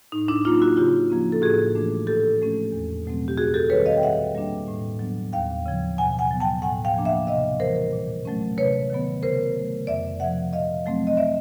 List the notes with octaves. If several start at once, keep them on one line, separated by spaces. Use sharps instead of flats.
A2 D#4
D4 E4
F#3 A#3 C#4 D#4 F4
E4 F#4
C#3 F4 G4
F3 A#3 C#4
A4
A2 F#4 G#4
E3 A3 D4
A#2 G4 A4
F3 A3 C#4
E2
B2 F#3 A3 C4
G4
F#2 F#4 G#4
G4 A4
D#3 G3 C4 B4 C#5
D#5 F5
G5
A#2 E5 F#5
G3 A#3 D4
A2
F#3 B3 D4
D#2 F5 G5
C#3 F3
B2 F#5 G#5
F#5 G#5
F#3 B3
G5 A5
A2 F#5 G#5
F5 G5
F3 A#3 D4
E5 F#5
C3 D#5 F5
E3 G3 A#4 C5
A#2
F#3 A3 C#4
C3 B4 C#5
D#3 F#3 B3
C#3 A#4 C5
F#3 A3
F2 D5 E5
C3 F3 E5 F#5
A#2 D#5 F5
F#3 A3 C4
D#5
D5 E5